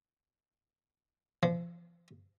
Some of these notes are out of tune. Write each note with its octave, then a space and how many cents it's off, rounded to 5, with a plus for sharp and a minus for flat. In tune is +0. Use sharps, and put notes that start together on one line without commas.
F3 -30